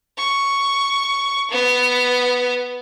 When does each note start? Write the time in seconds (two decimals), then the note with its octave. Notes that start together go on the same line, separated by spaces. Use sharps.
0.18 C#6
1.51 B3